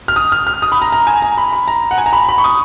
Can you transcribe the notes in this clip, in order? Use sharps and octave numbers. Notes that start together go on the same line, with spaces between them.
F6
D#6
F6
F6
D#6
B5
A#5
A#5
G#5
A#5
B5
B5
A#5
F#5
G#5
A#5
B5
B5
C#6
D#6